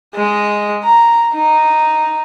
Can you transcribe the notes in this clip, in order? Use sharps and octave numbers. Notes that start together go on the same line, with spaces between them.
G#3 D#5
A#5
D#4